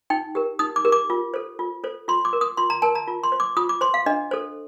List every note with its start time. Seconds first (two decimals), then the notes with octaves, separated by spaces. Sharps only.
0.10 D#4 G5
0.35 G4 A#4
0.59 D#4 D#6
0.76 D6
0.85 G4 A#4
0.92 D6
1.10 F4
1.34 A4 C5
1.59 F4
1.84 A4 C5
2.08 F4 C6
2.25 D6
2.33 A#4
2.41 D#6
2.57 F4 C6
2.70 A#5
2.82 A#4 A5
2.95 A#5
3.08 F4
3.23 C6
3.32 C5
3.40 D6
3.57 F4 D#6
3.69 D6
3.81 C5 C6
3.94 F5
4.06 D4 D#5
4.31 A4 C5